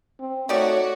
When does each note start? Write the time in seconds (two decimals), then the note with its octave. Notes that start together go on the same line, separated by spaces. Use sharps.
0.20 C4
0.49 A3 D#4 F#4 G4 C#5 D5